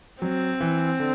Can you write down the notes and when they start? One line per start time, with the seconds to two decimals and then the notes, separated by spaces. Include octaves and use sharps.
0.22 F#3 C4
0.60 E3
0.99 D3